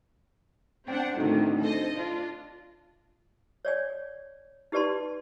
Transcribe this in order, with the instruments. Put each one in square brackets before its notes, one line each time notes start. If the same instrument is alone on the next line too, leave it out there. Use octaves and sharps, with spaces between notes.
[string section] C4 D4 F#5 [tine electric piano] G5
[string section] D2 A2 D#3 [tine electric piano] C4 D4 D#4
[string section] A4 C5 D#5
D4 F4
[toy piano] C#5 D5 G#5
D#4 G4 B4 D5 A5 C6